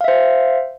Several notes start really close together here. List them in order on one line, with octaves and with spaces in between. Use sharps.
F5 E5 C5